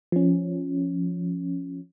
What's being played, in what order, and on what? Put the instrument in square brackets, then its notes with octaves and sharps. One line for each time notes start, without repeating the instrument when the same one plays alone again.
[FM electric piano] F3 C#4